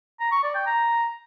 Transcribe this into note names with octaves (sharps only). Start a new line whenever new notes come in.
A#5
C#6
D5
G5
A#5